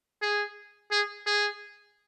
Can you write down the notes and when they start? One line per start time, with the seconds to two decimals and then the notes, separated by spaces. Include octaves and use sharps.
0.22 G#4
0.91 G#4
1.27 G#4